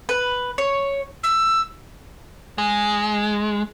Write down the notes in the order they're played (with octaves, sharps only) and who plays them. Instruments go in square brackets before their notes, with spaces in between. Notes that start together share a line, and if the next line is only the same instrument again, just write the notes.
[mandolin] B4
C#5
[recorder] E6
[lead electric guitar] G#3